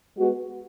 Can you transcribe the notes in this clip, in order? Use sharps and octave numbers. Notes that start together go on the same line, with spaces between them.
G#3 B3 F#4